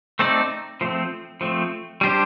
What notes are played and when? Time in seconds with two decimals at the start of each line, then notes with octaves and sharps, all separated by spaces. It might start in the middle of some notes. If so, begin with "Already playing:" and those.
0.19 A3 C4 D#4 A4 D5
0.81 F3 A3 C4
1.41 F3 A3 C4
2.01 G3 D4 G4 C5